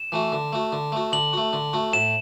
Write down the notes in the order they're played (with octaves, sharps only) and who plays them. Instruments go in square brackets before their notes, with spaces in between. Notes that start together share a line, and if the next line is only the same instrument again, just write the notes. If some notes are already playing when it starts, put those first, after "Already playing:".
Already playing: [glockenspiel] E7
[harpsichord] E3 A3 F#4
D3
A3 F#4
D3
A3 F#4
[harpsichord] D3 [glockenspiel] F#7
[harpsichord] A3 F#4
D3
A3 F#4
[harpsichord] A2 [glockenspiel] E7